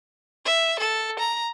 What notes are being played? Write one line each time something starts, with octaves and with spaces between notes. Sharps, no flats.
E5
A4
A#5